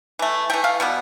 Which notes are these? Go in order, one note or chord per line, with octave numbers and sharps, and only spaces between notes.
E3 A3
E3 A3 G5
F5
B2 G3 B3